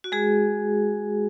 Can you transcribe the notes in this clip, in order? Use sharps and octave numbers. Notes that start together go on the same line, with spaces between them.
F#4
G#3 G#4